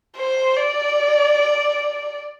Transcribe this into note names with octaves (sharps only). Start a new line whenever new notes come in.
C5
D5